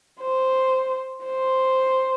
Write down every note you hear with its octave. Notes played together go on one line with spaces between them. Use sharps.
C5
C5